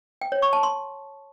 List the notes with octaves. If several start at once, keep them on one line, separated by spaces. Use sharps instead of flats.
G5
C#5
C#6
A5
C6